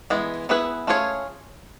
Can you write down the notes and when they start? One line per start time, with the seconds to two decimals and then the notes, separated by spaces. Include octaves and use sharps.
0.10 E3 G#3 B3
0.49 B3 E4 G#4 B4
0.87 A3 C#4 F4 G#4 C#5